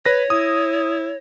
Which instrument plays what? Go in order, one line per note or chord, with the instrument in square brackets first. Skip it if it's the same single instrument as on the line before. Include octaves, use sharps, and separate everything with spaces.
[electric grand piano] B4 A#6 [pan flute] C#5
[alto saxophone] E4 [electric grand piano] D#6